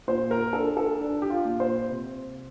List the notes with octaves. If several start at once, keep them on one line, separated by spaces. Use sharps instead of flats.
A#2 C5
A#4
D4 A4
A4
D4
G4
F4
A#2
C5
C3